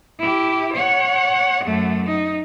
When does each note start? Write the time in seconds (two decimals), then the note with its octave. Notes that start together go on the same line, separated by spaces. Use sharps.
0.19 E4 G4
0.74 C#5 F#5
1.65 F#2 A3
2.07 D#4